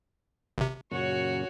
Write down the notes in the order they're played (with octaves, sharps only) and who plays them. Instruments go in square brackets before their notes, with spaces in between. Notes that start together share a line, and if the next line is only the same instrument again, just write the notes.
[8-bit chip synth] G#1 C3
[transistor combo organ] F#2 A#2 C#3 [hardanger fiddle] F#4 C#5